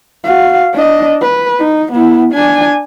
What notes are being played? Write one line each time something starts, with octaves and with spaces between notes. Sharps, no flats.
F#4 F5
D4 D#5
B4
D#4
B3 E4
D4 G#5